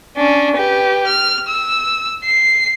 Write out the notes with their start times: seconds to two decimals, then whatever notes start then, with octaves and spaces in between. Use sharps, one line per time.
0.17 C#4 D4
0.56 G4 B4
1.07 F6
1.48 E6
2.25 C7